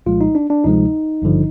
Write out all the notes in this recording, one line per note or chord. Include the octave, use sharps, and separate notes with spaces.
C2 A#2 F3 G#3 F4
D#4
D4
D4
D2 C3 F3 G#3 D#4
G#1 G2 D3 F3